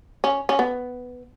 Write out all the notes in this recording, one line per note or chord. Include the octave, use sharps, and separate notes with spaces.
C#4
C#4
B3